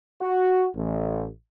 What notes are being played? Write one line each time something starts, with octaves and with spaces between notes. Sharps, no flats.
F#4
A1